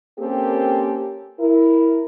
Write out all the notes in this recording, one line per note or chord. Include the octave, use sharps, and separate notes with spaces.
A#3 C4 C#4 G4 A4 A#4
E4 A#4